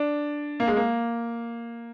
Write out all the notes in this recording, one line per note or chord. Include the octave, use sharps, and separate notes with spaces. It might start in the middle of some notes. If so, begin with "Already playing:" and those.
Already playing: D4
A#3
G#3
A#3